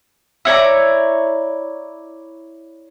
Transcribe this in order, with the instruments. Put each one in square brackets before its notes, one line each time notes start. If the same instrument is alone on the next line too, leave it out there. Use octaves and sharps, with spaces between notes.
[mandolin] E4 C#5 D5 A#5